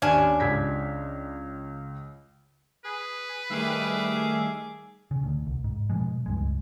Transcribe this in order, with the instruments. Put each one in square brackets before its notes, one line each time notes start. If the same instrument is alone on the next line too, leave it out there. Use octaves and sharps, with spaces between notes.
[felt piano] D#2 [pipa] C#4 D4 G#5
[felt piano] C#2 G#6 B6
[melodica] G#4 [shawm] B4
[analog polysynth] D#3 G3 A3 [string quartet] G#4 D6 [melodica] E5 F5
[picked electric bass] C#3
D2
C2
G#2
B2 F3 G#3
C#2 G2 G#3